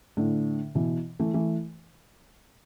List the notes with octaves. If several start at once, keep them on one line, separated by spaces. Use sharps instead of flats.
A2 D3
B2 E3
E3 A3
E3 A3